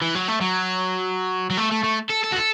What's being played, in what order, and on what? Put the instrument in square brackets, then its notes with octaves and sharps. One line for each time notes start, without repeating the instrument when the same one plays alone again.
[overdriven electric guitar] E3
F#3
A3
F#3
F#3
A3
A3
A3
A4
A4
F#4
A4